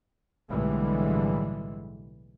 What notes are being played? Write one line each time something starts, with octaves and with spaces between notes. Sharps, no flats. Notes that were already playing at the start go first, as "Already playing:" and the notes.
B1 A2 D3 E3 G3 G#3